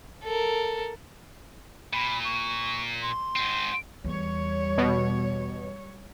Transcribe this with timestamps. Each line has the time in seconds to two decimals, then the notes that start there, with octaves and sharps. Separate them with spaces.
0.24 A4 A#4
1.93 A#2 B5
2.25 C#6
3.02 C6
3.36 G#2 C4
4.04 E2 G3 C#5
4.78 B2